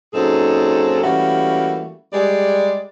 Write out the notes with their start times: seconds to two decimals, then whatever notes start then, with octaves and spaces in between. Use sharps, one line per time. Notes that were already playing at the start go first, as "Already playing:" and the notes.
0.14 F#2 A#2 C4 D#4 G#4 A4
1.03 E3 G3 A3 A#3 C#4 F#4
2.13 G3 G#3 D5